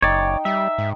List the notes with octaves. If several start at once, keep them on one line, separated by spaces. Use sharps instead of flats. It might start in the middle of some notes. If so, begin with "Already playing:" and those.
F#1 D#4 C#5 D5 G5
G3 E5
G#2